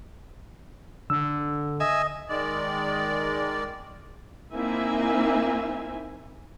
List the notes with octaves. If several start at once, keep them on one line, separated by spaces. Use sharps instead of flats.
D3 E6
D#5 E5 G#5
D#3 G#3 D5
A#3 C4 D#4 E4 E5 G#5